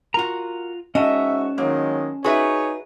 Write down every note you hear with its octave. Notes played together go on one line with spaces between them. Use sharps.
F4 F#4 A#4 A#5
G#2 C#4 F#4 D#5 E5 A5
D#3 F#3 G#3 A#3
D#4 F#4 G#4 B4 C#5 E5